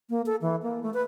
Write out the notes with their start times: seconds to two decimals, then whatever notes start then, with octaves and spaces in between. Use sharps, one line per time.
0.10 A#3
0.26 A4
0.42 E3
0.63 A#3
0.83 A3
0.94 B4